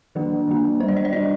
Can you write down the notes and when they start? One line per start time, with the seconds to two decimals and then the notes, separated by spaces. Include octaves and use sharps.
0.15 D#3 F#3 A#3 D4
0.48 D#3 F#3 A#3 D4
0.80 D4 C5
0.83 G3
0.88 D5
0.97 D#5
1.05 D5
1.13 G3 D4 D#5